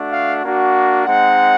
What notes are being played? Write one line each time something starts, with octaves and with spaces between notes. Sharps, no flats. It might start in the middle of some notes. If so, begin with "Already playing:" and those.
Already playing: A3 D4 F#4
F5
A#3 D4 F#4
G#3 C4 D#4 F#5